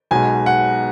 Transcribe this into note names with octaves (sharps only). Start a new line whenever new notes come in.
B1 B2 G#3 G#5
F#5